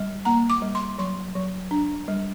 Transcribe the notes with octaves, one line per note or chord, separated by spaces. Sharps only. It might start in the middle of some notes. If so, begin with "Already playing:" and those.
Already playing: G3
A#3 A#5
D6
G3
C6
F#3 C6
F#3
D4
G3